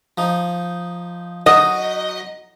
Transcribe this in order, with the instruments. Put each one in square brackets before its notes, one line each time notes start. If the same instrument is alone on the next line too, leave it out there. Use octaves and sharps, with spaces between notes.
[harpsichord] F3 D#4
[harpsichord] F#3 D#4 F#4 [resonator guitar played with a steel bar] D#5